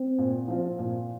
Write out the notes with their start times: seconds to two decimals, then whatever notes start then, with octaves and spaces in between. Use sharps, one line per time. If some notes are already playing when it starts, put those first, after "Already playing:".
Already playing: C4
0.18 A#2
0.48 F3 C4 F4
0.79 A#2